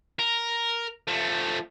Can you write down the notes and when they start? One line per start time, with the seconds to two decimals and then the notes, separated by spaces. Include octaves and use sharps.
0.19 A#4
1.08 F3 A3